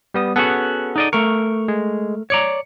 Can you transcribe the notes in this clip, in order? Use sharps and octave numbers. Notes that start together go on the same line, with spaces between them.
G3 B3 D#6
B3 C#4 F#4 G#4 A4 F#5
D#4 D5 D#5
A3 A#4 C#6
G#3
C#5 D5 A#5 C#7